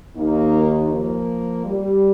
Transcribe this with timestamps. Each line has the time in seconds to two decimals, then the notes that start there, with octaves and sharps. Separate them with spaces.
0.15 D#2 D#3 A#3 D#4
0.89 F3 A#3
1.63 G3